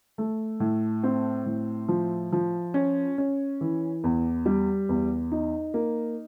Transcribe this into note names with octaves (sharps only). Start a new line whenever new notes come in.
A3
A2
C4
A2
F3
F3
C#4
C#4
E3
E2
G3
E2
D#4
A#3